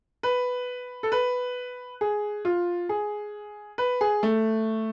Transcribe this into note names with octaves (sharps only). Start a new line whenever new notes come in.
B4
A4
B4
G#4
F4
G#4
B4
G#4
A3